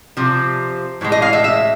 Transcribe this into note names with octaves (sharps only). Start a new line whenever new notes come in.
C3 F3
A2 E3 G#3
D#5
F5
E5
E5